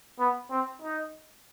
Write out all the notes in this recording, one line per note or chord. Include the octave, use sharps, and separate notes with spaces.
B3
C4
D#4